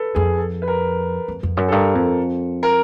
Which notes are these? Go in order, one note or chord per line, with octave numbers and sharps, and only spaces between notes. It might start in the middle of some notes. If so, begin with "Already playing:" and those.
Already playing: A4 B4
F2 G#4
A4
B4
A#4
F2
F2
F#2
A4
G2 A#4
F2
A#4